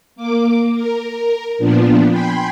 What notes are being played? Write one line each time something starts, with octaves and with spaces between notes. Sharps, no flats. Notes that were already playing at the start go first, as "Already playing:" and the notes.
A#3 D6
A#4
A#2 F3 B3 D4
G5 G#5 B5 C6